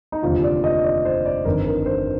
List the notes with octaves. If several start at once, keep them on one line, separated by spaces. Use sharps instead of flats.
D#4
F1 D#2 D3 F3 F4
D5
D#5
D5
C5
D5
G1 F2 D#3 A#4
A#4
C5